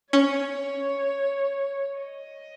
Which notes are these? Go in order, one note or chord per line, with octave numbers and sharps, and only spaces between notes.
C#4 C#5
D#5